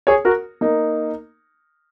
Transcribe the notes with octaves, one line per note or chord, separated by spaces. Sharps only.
G#4 C#5
F#4 A#4
A#3 D#4